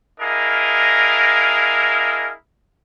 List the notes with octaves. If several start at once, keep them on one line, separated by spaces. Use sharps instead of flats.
D4 E4 G#4 A#4 D#5 F5